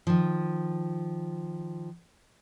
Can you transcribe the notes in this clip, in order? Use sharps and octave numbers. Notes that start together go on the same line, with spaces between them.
D#3 F3